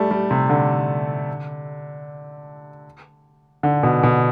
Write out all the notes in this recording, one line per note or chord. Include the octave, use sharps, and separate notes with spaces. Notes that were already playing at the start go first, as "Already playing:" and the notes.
Already playing: G3 A3
G3
C3
D3
D3
B2
B2